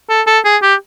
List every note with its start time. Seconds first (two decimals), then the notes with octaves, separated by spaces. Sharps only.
0.09 A4
0.27 A4
0.45 G#4
0.62 G4